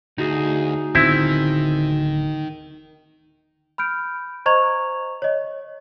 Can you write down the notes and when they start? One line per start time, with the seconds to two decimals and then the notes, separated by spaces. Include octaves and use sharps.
0.18 D2 D#4 F#4 G#4
0.95 D1 D3 D#3 B3 C4 E4
3.78 B5 F6 G6 D7
4.46 C5 D#5 A#5 C#6 G#6 F7
5.22 C#5 D#5